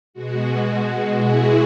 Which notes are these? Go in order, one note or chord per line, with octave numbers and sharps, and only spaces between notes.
B2 G#3 F#4
E4 G#4